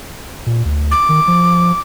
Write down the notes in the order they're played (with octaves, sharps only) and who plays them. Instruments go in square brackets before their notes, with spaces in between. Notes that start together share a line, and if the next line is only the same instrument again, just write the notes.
[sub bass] A#2
D2
[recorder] D6
[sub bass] D#3
F3